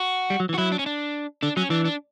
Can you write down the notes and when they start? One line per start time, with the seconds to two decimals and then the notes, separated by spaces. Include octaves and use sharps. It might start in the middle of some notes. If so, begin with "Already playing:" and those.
Already playing: F#4
0.30 G3
0.40 F#3
0.49 E3
0.54 F#4
0.58 F#3 E4
0.72 D4
0.79 C#4
0.86 D4
1.43 D3 D4
1.57 F#3 C#4
1.70 E3 D4
1.85 D4